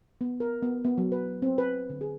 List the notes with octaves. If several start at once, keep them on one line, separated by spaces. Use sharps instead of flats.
B3
A#4
B3
B3
F#3
B4
C4
B4
D3
G#4